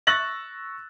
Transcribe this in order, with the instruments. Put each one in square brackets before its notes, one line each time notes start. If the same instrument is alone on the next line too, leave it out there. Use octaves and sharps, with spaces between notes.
[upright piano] C#6 E6 F#6 A6 A#6 F#7